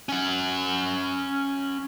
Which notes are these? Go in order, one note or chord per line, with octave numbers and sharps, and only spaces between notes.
C#4 F#5